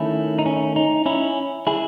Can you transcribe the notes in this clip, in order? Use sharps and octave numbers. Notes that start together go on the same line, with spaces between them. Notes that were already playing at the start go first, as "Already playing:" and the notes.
Already playing: D#3 A3 C#4 E4
D#4
C#4
D#4
C#4 E4
E4 G#4